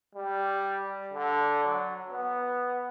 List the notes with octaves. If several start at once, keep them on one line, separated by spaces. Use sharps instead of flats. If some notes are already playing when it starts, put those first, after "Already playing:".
G3
D3
F#3
B3